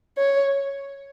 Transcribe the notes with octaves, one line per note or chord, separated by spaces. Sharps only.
C#5